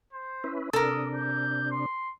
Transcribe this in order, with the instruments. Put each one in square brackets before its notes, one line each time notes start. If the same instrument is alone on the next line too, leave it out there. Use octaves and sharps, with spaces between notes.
[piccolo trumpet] C5
[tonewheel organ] C#4 E4 B4
[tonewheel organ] C3 D4 [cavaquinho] A4 A#4 [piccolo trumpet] D#6
[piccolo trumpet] G6
C6